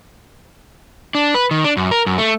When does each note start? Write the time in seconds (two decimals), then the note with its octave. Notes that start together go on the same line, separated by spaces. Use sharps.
1.15 D4
1.34 B4
1.51 D#3
1.64 D4
1.77 F#2
1.91 A#4
2.06 F#2
2.18 A3